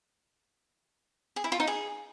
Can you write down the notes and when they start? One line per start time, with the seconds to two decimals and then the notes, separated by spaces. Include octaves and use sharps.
1.36 G#4
1.44 E4
1.52 F4
1.60 D#4
1.67 G#4